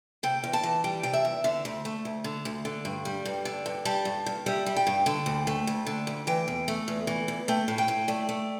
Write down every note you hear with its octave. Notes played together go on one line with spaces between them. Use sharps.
C3 G5
E2
A5
E3
G3 G5
C3 G5
E5
E2
D3 E5
D2
A3
D2
D3
D2
D3
G2
G3
G2
D3
G2
G3 A5
G2
G2
G3 E5
G3
G5
G2
D3
D2
A3
D2
D3
D2
E3 G5
E2
A3
E2
E3
E2
A3 G5
A2
G5
A2
A3 D5
A3